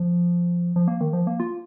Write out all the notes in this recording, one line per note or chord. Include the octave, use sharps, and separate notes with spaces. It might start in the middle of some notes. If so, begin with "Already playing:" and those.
Already playing: F3
F3
A#3
D#3
F3
A#3
F4